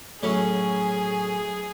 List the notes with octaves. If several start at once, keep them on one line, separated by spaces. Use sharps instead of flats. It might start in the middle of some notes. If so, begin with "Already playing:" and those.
A2 F#3 C#4 G#4